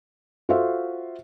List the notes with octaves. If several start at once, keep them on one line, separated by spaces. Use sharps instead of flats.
F4 F#4 A4 C5 E5 F5